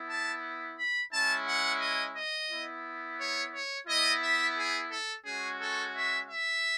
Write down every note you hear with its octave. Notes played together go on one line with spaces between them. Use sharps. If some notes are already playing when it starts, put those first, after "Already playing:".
Already playing: B3 E4
A5
B5
G#3 C#4 E4 A5
F#5
D#5
D#5
B3 E4
C#5
C#5
B3 E4 D#5
E5
G#4
A4
G#3 C#4 F#4 G#4
A4
E5
E5